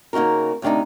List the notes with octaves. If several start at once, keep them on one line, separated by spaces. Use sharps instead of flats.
C#3 A#3 D#4 F#4 A#4
D2 C3 C4 D4 D#4